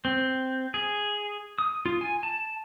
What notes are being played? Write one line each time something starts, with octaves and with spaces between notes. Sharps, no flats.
C4
G#4
D#6
F4
G#5
A5